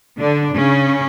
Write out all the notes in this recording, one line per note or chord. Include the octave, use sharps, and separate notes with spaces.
D3 D4
C#3 C#4